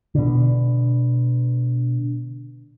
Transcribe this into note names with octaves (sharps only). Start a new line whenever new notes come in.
B2 D3